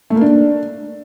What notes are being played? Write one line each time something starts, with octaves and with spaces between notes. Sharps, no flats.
A3
A#3
D4